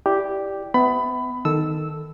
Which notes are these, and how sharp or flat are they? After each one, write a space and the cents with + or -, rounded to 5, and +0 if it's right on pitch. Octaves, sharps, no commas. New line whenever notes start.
E4 +0 G4 +0 D5 +0
B3 +30 E5 -10 B5 +20
D#3 +0 A4 +0 E6 -10